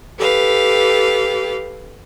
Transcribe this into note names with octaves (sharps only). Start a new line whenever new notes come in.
G4 A4 B4 F5